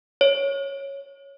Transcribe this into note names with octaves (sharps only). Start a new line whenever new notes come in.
C#5